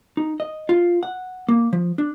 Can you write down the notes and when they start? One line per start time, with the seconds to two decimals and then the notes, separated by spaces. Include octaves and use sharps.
0.17 D#4
0.40 D#5
0.69 F4
1.03 F#5
1.49 A#3
1.73 F3
1.98 D4